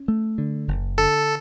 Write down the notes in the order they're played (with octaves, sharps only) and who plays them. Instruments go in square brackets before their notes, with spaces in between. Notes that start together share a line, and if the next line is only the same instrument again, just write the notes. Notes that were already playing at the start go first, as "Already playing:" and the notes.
Already playing: [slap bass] C#4
A3
D3
F#1
[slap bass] D3 [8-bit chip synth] A4